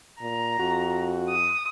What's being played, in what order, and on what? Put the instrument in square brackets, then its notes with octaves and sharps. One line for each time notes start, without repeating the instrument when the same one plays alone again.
[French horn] A#2 [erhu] A#5
[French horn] F2 [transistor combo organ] F#4
[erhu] D#6